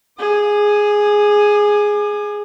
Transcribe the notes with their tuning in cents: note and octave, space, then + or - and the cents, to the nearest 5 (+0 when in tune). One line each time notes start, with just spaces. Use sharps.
G#4 +0 D6 +45